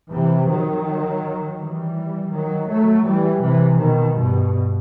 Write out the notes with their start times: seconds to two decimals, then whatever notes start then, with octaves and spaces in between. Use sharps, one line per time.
0.11 C3 E3
0.48 D#3 F#3
1.59 E3 G3
2.33 D#3 F#3
2.70 F#3 A3
3.07 E3 G3
3.43 C3 E3
3.81 B2 D#3
4.18 G2 B2